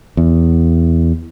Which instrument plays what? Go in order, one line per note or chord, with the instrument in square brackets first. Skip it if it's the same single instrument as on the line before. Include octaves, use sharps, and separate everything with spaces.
[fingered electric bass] E2